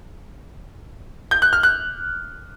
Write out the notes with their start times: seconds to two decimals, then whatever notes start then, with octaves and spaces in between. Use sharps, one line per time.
1.31 G6
1.42 F#6
1.53 F6
1.63 F#6